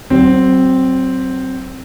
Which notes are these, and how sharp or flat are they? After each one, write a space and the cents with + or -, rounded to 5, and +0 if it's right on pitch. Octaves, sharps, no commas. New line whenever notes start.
F#3 +35 C4 +0